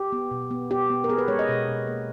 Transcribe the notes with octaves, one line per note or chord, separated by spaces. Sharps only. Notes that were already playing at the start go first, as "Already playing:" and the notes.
Already playing: G4
B3
B2
B3
B3 G4
B3
A#4
B3 G#4
B4
G#3 C#5
D#5
B2
B2
A#3